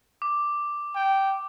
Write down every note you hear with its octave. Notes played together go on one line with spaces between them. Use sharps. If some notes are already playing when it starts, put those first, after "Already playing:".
D6
G5